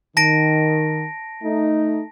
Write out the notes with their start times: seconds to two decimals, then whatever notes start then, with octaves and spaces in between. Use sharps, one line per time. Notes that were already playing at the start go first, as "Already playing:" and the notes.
0.17 D#3 A5 A#6 D7
1.43 A3 D#4